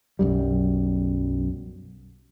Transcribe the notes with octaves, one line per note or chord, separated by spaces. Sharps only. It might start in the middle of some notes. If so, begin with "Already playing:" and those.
B1 F#2 G3